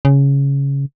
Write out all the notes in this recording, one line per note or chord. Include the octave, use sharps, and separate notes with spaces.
C#3